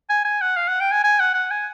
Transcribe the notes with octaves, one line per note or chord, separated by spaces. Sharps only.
G#5
G#5
F#5
F5
F#5
G5
G#5
G#5
F#5
F#5
G#5